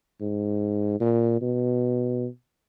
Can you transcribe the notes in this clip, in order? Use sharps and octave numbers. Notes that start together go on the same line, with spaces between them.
G#2
A#2
B2